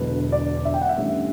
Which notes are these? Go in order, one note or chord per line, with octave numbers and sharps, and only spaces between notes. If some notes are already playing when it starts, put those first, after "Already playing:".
Already playing: E1 E2 D3 F#3 B4
D5
E5
G5
F#5
E5
G1 G2 E3 A3 C#4